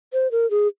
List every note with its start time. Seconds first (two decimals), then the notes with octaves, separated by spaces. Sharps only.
0.13 C5
0.32 A#4
0.51 G#4